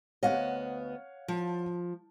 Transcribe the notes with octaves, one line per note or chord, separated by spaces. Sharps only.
D2 B3 C#5 D#5 F5 F#5
F3